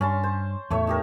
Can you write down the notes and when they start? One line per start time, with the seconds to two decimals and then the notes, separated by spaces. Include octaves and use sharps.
0.01 G2 C#4 A5 C6
0.23 C5
0.70 E2 A2 A3 C#5 E5
0.87 D#4 G4 A#4